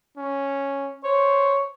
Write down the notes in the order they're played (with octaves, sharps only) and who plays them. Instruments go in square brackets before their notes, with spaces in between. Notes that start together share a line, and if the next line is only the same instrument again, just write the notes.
[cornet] C#4
[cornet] C5 [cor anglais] C#5